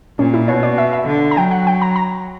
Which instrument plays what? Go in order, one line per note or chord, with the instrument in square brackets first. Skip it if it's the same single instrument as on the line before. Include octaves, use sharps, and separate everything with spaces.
[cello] A#2 [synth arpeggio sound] C#4
[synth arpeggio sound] E4
[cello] B2 [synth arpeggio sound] C#5
[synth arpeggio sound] D5
E5
E5
[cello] D3
[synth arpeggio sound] A#5
[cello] F#3 [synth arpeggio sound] G5
[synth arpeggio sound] F#5
G5
A#5
A#5